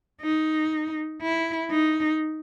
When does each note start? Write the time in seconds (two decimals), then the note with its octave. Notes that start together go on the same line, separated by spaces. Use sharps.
0.21 D#4
1.21 E4
1.71 D#4